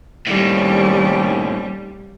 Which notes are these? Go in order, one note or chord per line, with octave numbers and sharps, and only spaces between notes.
D#2 A2 D#3 G3 C4 C#4